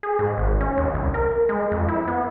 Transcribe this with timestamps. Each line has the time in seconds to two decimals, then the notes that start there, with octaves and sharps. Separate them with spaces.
0.03 G#4
0.19 G#2
0.38 G#1
0.61 C#4
0.78 D#2
0.94 C2
1.14 A#4
1.49 G#3
1.72 F2
1.88 E4
2.07 B3